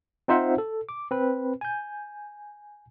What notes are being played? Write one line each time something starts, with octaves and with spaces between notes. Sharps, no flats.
C4 D#4 F4 C5 E5 F#5
A4
D6
C4 B4
G#5 G6